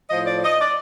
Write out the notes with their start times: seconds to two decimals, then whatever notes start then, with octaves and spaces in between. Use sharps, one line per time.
0.09 A2 F3 D#5
0.26 D5
0.42 D#5
0.59 D5